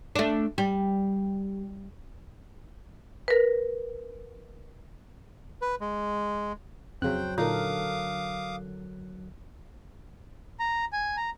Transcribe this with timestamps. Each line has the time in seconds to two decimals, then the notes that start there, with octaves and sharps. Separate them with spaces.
0.16 A3 D4
0.58 G3
3.28 A#4 B4
5.62 B4
5.81 G#3
7.02 F2 C#3 F#3 C5 G5 F#6
7.38 A#2 D3 D#4 A4 A#4 F5 D6 D#6
10.60 A#5
10.93 G#5
11.17 A#5